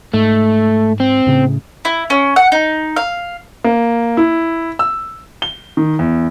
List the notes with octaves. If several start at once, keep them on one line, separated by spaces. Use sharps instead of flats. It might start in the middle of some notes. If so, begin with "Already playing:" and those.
G#2 A3
C4
A2 C#3
E4
C#4
F#5
D#4
F5
A#3
E4
E6
G7
D#3
E2